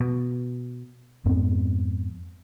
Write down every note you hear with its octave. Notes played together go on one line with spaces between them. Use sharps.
B2
F2 G#2 B3 C4